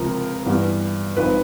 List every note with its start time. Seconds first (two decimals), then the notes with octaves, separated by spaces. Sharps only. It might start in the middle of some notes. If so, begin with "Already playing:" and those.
Already playing: C#2 C3 F3 A#4
0.46 G2 E3 G3 B3
1.16 G#1 G#2 F3 B4